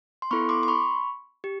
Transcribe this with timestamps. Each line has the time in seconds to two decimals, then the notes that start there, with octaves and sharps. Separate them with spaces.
0.22 C6
0.31 B3 E4 A4 B5 C#6
0.49 C6 D6
0.63 C6
0.68 B5 C#6
1.44 G4